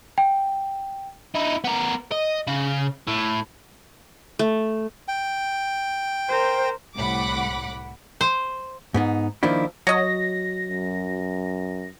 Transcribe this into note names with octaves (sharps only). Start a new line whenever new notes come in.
G5
D#4 E4
B3 A#4
D#5
C#3
A2
A3
G5
A#4 C5
C2 A2 F#5 B5 D6
C5
G#2 B3 D#4
D#3 F3 A#3 D4 E4
F#3 C#5 D#5 A#6
F#2